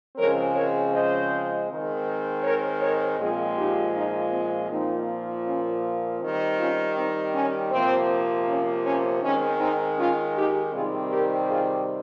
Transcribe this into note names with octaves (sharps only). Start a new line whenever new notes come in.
C#3 F3 G#3 C4 A#4 C#5
A#4 C#5
C5 D#5
D#3 G#3 C4
A#4 C#5
A#4 C#5
A#2 F3 G#3 C4 F4 G#4
D#4 G4
C4 D#4
C4
A#2 F3 A#3 C4 D#4
C#4
D#3 G3 C4
C#4 F4
C4 D#4
C#4
C3 F3 A#3 C4
C#4
C#4
D#3 G#3 C4 C#4
C4 D#4
C#4 F4
D#4 G4
C3 D#3 G3 C4 F4 G#4
G4 A#4
F4 G#4